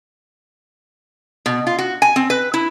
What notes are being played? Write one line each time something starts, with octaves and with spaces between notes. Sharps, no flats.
B2
F4
F#4
G#5
C4
B4
E4